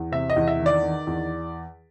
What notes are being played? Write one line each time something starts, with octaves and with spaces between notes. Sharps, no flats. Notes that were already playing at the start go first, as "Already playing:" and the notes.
Already playing: E2
C3 E5
D#5
E2
E5
D#3
D5
D#3
E2